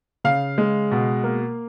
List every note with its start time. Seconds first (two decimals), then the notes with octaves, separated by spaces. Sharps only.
0.24 C#3 F5
0.58 G#3
0.91 B2
1.24 A#3